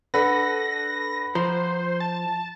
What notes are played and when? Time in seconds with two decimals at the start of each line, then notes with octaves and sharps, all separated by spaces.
0.14 D4 A4 B4 F#5 B5 A#6
1.35 F3 C5 A#5
2.00 A5